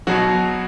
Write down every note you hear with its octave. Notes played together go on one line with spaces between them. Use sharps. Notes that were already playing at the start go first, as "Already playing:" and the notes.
B2 F#3 F#4